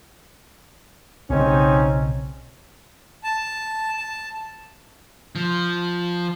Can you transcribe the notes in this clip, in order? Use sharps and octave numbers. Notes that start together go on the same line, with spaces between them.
B1 C#3 C4 C#4 D#4
A5
A5
F3